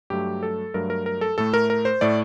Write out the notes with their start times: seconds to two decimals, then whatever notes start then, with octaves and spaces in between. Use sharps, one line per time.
0.10 G2 F#3 A3 G4
0.43 A4
0.74 G2 F#3 A3 A#4
0.90 A#4
1.06 A#4
1.21 A4
1.38 A2 A3 A4
1.54 A#4
1.70 A#4
1.85 C5
2.01 A2 A3 D5